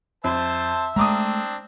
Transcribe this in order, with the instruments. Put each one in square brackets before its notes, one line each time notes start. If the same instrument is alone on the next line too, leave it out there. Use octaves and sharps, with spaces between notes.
[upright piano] F2 [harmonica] C5 A5 [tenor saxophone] E5
[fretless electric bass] G#3 A3 [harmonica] C4 D4 [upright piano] A#5 D6 D#6